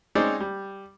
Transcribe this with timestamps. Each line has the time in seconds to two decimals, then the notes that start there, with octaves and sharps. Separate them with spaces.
0.15 G#3 C4 C#4 D#4 C5 D5
0.40 G3